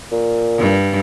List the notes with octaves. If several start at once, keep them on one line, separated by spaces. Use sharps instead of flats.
A#2
G2